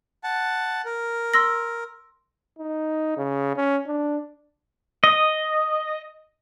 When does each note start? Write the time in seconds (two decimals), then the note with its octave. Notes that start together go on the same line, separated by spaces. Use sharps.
0.24 F#5 A5
0.85 A#4
1.34 C6 E6 A#6
2.59 D#4
3.17 C#3
3.56 C#4
3.87 D4
5.04 D#5